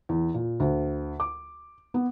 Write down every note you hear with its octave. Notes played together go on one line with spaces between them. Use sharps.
E2
A#2
D2
D6
B3